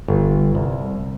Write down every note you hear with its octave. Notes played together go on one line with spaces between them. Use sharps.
G1
C2